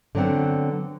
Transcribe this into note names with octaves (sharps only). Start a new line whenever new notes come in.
D3 F#3 B3 C4 F#5